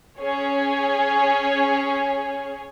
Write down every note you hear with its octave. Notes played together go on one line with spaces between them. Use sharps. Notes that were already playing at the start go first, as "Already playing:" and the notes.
C#4 G#4 C#5